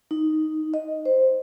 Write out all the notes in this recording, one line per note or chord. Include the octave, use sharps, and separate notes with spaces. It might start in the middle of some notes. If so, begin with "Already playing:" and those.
D#4
D#5
C5